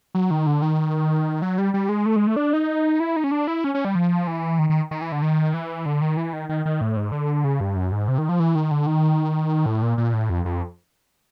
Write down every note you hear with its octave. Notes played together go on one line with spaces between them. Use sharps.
F#3
D#3
D3
D#3
F#3
G3
G3
G#3
A3
G#3
A3
D4
D#4
E4
D#4
C#4
D4
E4
C#4
C#4
G3
F3
E3
D#3
D#3
D#3
E3
D3
D#3
E3
D3
D#3
E3
D#3
D#3
D#3
A2
G#2
D3
C#3
G2
F#2
G#2
C3
D#3
F3
E3
D#3
D3
D#3
A2
A#2
A#2
A2
F2
F2